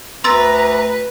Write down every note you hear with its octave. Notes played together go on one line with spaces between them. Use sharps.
D2 B4 A#5 C6 E6 A6